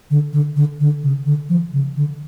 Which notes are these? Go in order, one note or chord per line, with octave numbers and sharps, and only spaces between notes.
D3
D3
D3
D3
C#3
D3
F3
C#3
D3